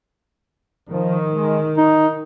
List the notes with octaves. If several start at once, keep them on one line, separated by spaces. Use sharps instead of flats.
D#3 F3
G#3
D#4